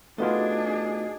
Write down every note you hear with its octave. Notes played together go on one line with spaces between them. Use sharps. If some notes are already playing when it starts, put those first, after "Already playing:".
A3 B3 D4 D#4 F4 F#4 G#4 D#5